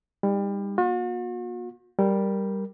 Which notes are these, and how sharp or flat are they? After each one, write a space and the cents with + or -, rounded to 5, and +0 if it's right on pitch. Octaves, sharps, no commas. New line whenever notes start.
G3 +30 D#4 +10
A#3 +40 F#4 -45
G3 +0 A#4 +0